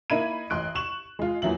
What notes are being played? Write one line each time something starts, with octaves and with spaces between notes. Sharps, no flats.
A#3 D#4 E4 B5 G#6 D#7
A1 D#5 C6 F#6 D7
C#6 E7 F#7
G#3 F4
E2 A#2 F#3 E5 F#7